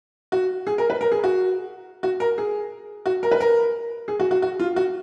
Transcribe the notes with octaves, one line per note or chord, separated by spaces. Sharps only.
F#4
G#4
A#4
B4
A#4
G#4
F#4
F#4
A#4
G#4
F#4
A#4
B4
A#4
G#4
F#4
F#4
F#4
F4
F#4